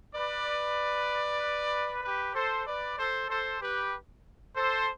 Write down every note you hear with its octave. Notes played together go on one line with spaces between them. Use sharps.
B4 D5
G4 B4
A4 C5
B4 D5
A4 C5
A4 C5
G4 B4
A4 C5